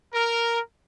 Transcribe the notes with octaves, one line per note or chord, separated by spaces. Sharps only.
A#4